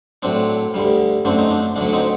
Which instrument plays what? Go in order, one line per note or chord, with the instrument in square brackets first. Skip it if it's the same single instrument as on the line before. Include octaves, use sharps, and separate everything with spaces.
[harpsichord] A2 F#3 C4 D4
D2 D3 G3
F#2 D3 A3 C4 D4
D#4
D4
D2 D3 F#3 D4
C4 D#4